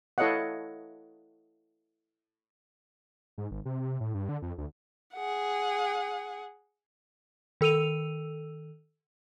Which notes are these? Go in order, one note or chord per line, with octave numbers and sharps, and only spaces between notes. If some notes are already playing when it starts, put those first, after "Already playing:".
E4 A4 C#5 D#5 F5 F#5
G#2
G#1
C3
C3
A2
G2
D3
F2
D2
G#4 F#5
D#3 A4 E6 D#7 F7